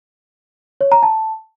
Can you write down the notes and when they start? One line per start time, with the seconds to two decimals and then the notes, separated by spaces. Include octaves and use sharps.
0.81 C#5
0.92 A#5
1.03 A5